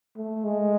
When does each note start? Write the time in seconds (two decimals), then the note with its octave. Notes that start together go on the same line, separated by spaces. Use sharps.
0.16 A3
0.44 G#3